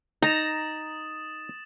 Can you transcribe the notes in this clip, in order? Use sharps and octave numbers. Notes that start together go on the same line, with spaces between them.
D#4 A#5 D#6 A6 E7